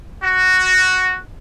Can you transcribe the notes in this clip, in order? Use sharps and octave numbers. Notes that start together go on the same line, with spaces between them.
F#4